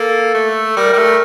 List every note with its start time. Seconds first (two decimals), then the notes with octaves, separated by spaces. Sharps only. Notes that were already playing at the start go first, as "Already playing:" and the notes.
Already playing: A#3 A4
0.34 A3
0.76 G3 A#4
0.93 G3
0.97 A3